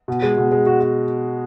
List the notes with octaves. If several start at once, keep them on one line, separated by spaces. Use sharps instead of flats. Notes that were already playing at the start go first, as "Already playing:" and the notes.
B2
G#3
B2
G#3
F#4
F#4